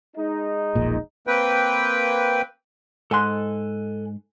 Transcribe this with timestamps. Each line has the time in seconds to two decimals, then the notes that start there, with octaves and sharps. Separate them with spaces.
0.16 G#3 D#4
0.75 E1 A#1 A#2
1.27 A#3 C4 B4 G5
3.11 G#2 A4 G#5 C6 F#6